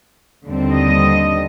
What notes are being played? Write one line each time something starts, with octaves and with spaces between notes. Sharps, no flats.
D#2 D3 G3 C4
D#5